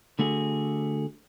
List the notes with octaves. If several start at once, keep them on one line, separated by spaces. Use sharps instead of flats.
D3 A3 F#4 G#4